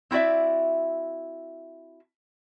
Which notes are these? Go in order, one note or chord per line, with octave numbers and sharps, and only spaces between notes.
C4 E4 F#4 D5 E5